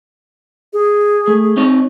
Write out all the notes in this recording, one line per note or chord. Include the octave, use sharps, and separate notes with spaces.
G#4
A3
C4 D#4 C#5